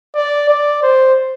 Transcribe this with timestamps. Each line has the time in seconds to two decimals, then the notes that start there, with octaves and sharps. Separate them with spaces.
0.15 D5
0.49 D5
0.83 C5